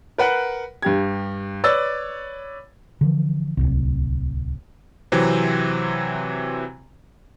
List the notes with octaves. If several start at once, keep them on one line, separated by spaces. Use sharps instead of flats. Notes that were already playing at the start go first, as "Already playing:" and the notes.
A#4 B4 F#5
G2 G4 G#6
B4 C#5 D5 E6 A6
D3 E3 F3
D1 G1 C2
C3 E3 F#3 C4